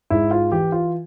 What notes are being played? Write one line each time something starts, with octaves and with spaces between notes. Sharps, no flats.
G#2 E4
F4
E3 G4
F4